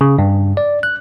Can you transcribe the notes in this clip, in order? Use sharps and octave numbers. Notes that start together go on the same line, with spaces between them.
C#3
G2
D5
F#6